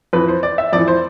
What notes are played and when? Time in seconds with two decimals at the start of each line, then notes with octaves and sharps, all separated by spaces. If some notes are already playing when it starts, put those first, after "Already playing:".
0.13 F2 E3 B4
0.28 C5
0.43 D5
0.58 E5
0.73 F2 E3 D5
0.88 C5